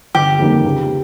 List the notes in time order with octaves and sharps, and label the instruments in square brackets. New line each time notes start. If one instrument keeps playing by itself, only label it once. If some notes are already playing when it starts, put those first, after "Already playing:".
[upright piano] G1 [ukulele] G4
[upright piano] F2 D#3 G3 A#3
C#2